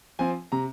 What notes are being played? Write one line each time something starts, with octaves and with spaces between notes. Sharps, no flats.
F3 C4 G#5
C3 A#5